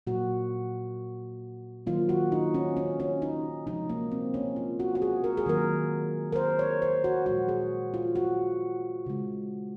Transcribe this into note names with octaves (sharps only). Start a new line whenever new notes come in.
A#2 F#3 A#3 F#4
D#3 F#3 A#3 F4
F#4
D#4
C#4
C#4
C#4
D#4
C3 F3 G#3 D#4
A#3
C4
C#4
F4
F#4
F#4
G#4
A#4
G#4
D#3 F#3 A#3 A#4
A#4
C5
C#5
C5
F#4
A#2 F3 G#3 F#4
G#4
F4
F#4
C#3 G#3